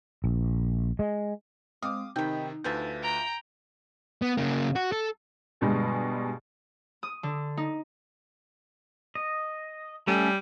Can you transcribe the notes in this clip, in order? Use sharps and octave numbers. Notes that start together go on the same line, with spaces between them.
A#1
G#3
G#3 C4 F5 D6 D#6
C3 D#3 D#4 G5 B5
D2 F4 B4 E5 A5 G6
G5 A#5
B3
C#3 A#3
F#4
A4
G2 B2 D3 G3 G#3
D#6
D3
D#4
D#5
G3 A3 C#4 A4